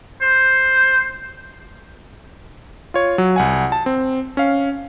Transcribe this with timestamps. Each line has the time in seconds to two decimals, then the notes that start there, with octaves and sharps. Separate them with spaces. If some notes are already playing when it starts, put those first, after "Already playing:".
0.21 C5
2.94 F4 C#5
3.18 F#3
3.36 C2 F#5 G#5
3.72 A5
3.86 C4
4.37 C#4 F5